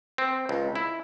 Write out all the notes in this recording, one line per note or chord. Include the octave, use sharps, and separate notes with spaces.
C4
C#2
E4